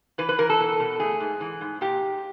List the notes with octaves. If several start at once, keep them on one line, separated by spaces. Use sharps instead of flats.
E3 B4
B4
E3 A#4
A4
B2
B2
A3 G#4
G#2
E3
G#2
A#2 G4